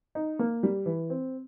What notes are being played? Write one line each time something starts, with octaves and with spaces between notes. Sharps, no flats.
D#4
A#3
G3
E3
C4